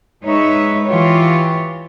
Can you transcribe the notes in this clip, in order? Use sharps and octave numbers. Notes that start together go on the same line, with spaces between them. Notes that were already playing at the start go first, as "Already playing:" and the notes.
G#3 D#4 B4 C#5 E5
E3 F4 G4 C#5